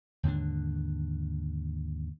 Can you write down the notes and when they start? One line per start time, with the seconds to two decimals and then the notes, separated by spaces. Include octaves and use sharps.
0.23 D#2 G#2 D3 D4